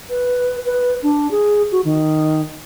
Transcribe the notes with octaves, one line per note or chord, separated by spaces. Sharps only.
B4
B4
D4
G#4
F#4
D#3